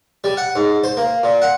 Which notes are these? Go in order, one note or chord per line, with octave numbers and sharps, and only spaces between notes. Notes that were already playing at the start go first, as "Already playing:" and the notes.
G3
F#5
G#2
C5
A#3
A#2
F#5